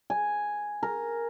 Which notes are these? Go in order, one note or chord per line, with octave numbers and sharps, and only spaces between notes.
G#5
A#4